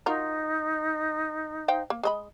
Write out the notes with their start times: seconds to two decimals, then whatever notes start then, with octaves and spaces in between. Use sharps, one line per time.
0.06 D#4 F4 F#4 A#4
1.68 C5 F5 G5
1.90 A#3
2.03 G#3 D#5 B5